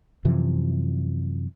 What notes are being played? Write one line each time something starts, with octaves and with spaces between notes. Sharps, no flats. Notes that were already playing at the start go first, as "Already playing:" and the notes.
F#2 C3 E3 F3